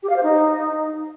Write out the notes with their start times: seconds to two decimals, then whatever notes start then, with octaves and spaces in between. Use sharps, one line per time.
0.03 G4
0.10 F5
0.16 C5
0.23 D#4